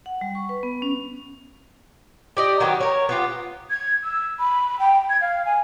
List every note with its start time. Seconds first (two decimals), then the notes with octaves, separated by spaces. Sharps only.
0.06 F#5
0.21 G3
0.35 C#6
0.49 B4
0.63 B3
0.82 C#4
2.37 G4 D5 D#5
2.60 D#3 F#3 B3 G4
2.80 A#4 C#5
3.09 B3 F4 G4
3.70 G#6
4.04 E6
4.39 B5
4.79 G5
5.09 G#6
5.21 F5
5.46 G#5